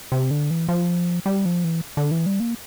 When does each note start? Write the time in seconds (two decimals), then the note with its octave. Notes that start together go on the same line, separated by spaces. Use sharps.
0.12 C3
0.31 D3
0.50 E3
0.69 F3
1.26 G3
1.45 F3
1.64 E3
1.97 D3
2.11 E3
2.26 G3
2.40 A#3